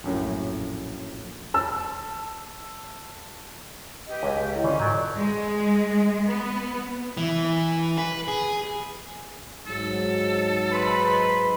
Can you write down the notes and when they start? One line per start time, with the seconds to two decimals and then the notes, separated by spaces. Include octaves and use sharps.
0.04 A#1 F#2 A2
1.54 A5 E6
4.08 G4 B4 D#5
4.23 C#2
4.51 E4 A4 D#5
4.64 D3 E3 C#4 F4 D5 D#5 C#6
4.79 G#2 F#3 A4 D5 G6 G#6
5.17 G#3
6.27 B3
7.17 E3
7.98 B4
8.28 G#4
9.67 G#2 F#3 A4
10.72 D#4 B4 B5 C6